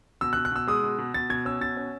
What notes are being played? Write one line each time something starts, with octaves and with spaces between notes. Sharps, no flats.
B2 E6
F#6
B2
F#6
B2 E6
G#3 D#6
B2
B2
B2 A6
B2 G#6
C#4 E6
B2 A6
C#4